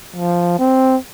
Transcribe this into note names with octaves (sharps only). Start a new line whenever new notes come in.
F3
C4